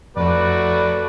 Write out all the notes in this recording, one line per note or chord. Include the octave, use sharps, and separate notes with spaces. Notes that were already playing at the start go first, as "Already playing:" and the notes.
F2 A3 F#4 B4 D5